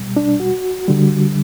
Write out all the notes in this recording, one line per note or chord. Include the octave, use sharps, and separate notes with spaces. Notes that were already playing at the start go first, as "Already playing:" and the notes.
Already playing: B2 G3
D4
F#4
D3 G3